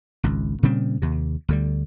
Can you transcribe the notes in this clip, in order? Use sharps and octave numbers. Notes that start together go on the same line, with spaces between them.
G#1 C#2
A#2 C#3 G3 C4
D#2 C3
D2 D3 G3